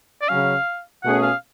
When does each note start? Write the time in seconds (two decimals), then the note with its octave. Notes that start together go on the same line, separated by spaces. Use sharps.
0.21 D5
0.28 C#3 F#3 C#4 F5
1.03 B2 A3 C#4 G#4 F#5
1.23 F5